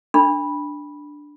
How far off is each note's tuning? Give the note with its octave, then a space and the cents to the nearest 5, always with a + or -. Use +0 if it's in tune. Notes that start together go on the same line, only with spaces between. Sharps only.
D4 +0 B5 -10